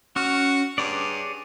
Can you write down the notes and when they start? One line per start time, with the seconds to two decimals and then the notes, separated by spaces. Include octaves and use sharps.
0.16 C#4 F#4 C#6 F6
0.78 G2 G#4 C#5 D5